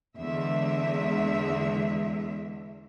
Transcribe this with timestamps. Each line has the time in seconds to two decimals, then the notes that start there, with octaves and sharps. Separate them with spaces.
0.18 E2 D3 G#3 E5